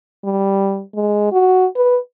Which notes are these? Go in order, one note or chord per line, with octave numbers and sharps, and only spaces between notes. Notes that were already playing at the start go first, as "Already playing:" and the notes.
G3
G#3
F#4
B4